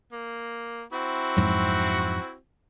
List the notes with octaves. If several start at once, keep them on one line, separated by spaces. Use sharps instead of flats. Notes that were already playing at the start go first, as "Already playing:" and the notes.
A#3
C4 E4 F#4
F2 G#2 F#3